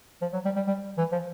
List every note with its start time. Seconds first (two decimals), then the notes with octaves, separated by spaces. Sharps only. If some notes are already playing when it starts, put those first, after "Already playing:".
0.22 F3
0.33 F#3
0.45 G3
0.56 G3
0.67 G3
0.98 E3
1.12 F3